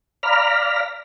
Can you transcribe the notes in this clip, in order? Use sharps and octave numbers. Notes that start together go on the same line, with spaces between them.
D5 F5 A#5 B5 F6